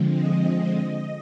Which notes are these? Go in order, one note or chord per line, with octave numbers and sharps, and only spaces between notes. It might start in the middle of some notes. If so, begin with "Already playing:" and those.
Already playing: D3 F3 G#3 C4
D#5